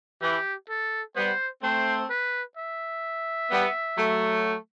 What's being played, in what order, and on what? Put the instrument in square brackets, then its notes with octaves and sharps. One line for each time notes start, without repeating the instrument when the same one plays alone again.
[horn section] E3 [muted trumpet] G4
[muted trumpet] A4
[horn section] G3 B3 [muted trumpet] C5
[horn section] A3 C4 [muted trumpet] C5
[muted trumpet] B4
E5
[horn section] G3 B3
F#3 A3